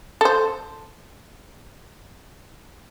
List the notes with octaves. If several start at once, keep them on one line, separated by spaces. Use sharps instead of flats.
A4 C5